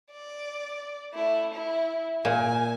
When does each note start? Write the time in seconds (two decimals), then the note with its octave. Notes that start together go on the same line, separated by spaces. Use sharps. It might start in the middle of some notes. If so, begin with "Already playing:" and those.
0.12 D5
1.13 A3 E4
1.53 E4
2.25 A#2 G#5